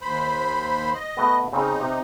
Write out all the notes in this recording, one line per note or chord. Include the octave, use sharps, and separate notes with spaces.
D#2 C5 B5
D#5
A3 B3
C#3 C4 D#4
C3